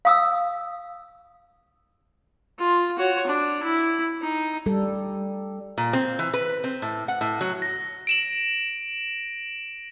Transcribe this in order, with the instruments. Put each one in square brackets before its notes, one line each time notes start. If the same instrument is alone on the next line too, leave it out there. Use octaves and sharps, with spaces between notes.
[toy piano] F5 D#6 E6
[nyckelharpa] F4
F#4 C#5
D4
E4
D#4
[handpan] G3 A4
[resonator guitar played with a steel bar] A#2
C4
E3
B4
C4
A2
F#5
A2
F#3
[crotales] A#6
D7 E7 F#7